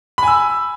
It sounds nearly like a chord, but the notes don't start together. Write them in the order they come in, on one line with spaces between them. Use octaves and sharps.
B5 G#5 E6